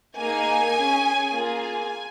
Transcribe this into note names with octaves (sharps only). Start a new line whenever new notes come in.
A#3 D#4 G#4 G#5
C#4 G#4
A#3 F4 G#4 G#5